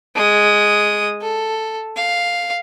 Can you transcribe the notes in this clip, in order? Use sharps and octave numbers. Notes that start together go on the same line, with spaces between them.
G#3 D#6
A4
F5